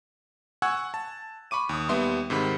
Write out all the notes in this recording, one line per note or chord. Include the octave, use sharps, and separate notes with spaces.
F#5 G#5 C#6 E6 F#6 G#6
A5
B5 C#6 D6 D#7
D#2 D#6
D#2 G3 B3 E5 C6
G#2 C3 D#3 B5